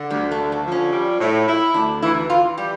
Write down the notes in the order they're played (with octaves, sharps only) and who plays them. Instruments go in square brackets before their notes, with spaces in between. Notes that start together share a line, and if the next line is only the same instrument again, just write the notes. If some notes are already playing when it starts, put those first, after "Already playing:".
Already playing: [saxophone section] D3
[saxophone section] D2 [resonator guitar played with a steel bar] G3
[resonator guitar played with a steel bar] A3
[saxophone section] D3
[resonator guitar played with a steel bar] A3
[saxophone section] F3
[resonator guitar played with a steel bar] C#4
[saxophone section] G3
A2
E4
[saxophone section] D2 [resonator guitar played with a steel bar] D4
[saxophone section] E3 [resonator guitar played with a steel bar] E4
[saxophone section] E3 [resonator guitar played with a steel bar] F4
[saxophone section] G3 [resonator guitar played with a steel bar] G4